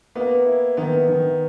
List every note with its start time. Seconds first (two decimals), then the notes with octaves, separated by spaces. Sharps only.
0.15 A#3 B3
0.46 E4
0.77 D#3 B3
1.08 D#3